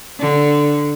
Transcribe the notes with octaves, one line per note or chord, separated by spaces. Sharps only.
D3